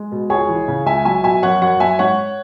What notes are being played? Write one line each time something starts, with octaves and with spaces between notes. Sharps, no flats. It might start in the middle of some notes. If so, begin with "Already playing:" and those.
Already playing: G#3
B2
C#2 G#4 C#5
E3
C#3
C#2 E5 G#5
F#3 E5 G#5
B2 E5 G#5
F#2 C#5 F#5
F#2 C#5 F#5
F#3 E5 G#5
G#2 C#5 F#5